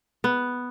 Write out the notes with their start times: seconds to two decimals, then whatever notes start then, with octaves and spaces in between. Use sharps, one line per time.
0.24 B3